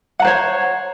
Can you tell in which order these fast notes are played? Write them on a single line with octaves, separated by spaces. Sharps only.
F#5 A#5 C5 C#5